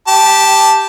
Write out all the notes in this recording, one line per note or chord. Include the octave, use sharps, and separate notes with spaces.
G4 A5